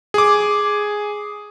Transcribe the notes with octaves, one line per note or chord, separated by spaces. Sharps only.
G#4 D6